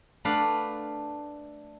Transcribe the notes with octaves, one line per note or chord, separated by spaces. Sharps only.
A3 D4 B4 D5 F5 F#5